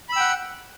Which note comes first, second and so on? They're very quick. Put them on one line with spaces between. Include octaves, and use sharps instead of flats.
B5 E6 G5 F#5